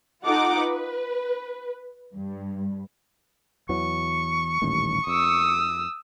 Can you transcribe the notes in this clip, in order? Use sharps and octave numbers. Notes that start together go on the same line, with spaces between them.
D#4 F4 A4 F#5 D6
B4
G2
E2 E3 F#3 C#6
D#1 A1 D#2
F2 D#6 E6